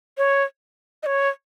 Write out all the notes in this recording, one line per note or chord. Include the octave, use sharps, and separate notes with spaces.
C#5
D#5
C#5